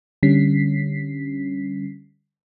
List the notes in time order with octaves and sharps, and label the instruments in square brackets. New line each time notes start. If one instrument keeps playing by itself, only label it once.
[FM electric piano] D3 G3 C#4 B6 C7